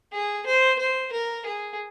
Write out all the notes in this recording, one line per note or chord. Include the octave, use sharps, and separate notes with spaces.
G#4
C5
C5
A#4
G#4